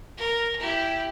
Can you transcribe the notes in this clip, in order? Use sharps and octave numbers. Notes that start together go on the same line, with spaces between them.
A#4
E4 G4